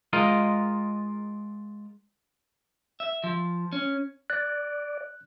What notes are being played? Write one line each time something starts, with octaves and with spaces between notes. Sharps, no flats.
G#3 F4 A#4 D#5
E5
F3
C#4
D5 F#6